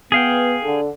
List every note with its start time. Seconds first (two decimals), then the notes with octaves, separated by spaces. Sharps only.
0.12 B3 G#4 F5 G5
0.63 D3